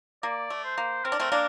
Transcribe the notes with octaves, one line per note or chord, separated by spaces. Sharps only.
A#3 D5
A3
C5
A#3
C4 A#4
D4
A3 C4
A#3 D4